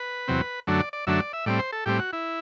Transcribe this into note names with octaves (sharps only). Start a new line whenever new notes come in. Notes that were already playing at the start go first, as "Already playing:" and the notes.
Already playing: B4
E2 C3 F#3 C4
F#2 D3 F#3 A3 D4
D5
D5
F#2 D3 F#3 A3 D4 E5
D5
E5
A2 G3 C4 D5
C5
A4
A2 G3 C4 G4
F#4
E4